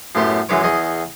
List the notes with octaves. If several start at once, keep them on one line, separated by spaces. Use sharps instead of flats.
F#2 A2 B3 G4 C6
F#2 E3 G#3 B4 C#5 D6
E2 G#4 D#5 C#6